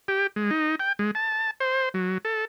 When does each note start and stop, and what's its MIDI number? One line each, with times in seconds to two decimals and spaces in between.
0.08 0.27 67
0.36 0.50 56
0.51 0.75 63
0.79 0.92 79
0.99 1.11 56
1.15 1.51 81
1.60 1.89 72
1.94 2.18 54
2.25 2.45 69